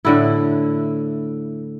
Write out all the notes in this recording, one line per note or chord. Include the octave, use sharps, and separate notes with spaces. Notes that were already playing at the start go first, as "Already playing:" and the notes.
A2 D3 E4